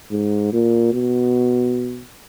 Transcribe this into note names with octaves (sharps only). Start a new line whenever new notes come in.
G#2
A#2
B2